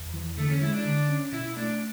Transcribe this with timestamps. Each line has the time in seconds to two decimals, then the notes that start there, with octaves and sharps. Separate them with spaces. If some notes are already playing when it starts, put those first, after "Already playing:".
Already playing: E2
0.14 E3
0.38 D3 A3
0.50 C#4
0.62 G#3 E4
0.73 D4
0.85 D3
1.09 C#4
1.32 B2 E4
1.56 A3 D4